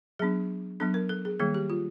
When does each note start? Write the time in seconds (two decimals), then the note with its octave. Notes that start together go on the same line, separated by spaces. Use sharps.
0.19 F#3 B3 D4 G#4
0.80 F#3 B3 D4 A4
0.94 A#4
1.09 A4
1.25 G#4
1.39 D#3 G3 A#3 G#4
1.54 G4
1.70 F4